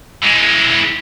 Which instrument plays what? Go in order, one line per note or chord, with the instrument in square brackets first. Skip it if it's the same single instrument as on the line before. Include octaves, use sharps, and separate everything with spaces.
[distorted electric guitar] E3 G#3